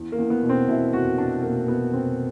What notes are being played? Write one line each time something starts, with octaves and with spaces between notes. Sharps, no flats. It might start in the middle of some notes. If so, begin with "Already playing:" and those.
Already playing: E2
A#3
E2
B3
B2
C4
B2 E4
F1 F#4
B2 D4
B2 A#3
B2 B3
F1 C4